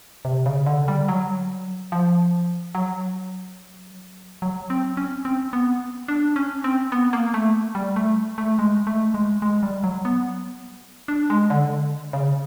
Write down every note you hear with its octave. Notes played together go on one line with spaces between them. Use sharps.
C3
C#3
D3
G3
F#3
F3
F#3
F#3
C4
C#4
C4
B3
D4
C#4
C4
B3
A#3
A3
G3
A3
A3
G#3
A3
G#3
G#3
G3
F#3
B3
D4
G#3
D3
C#3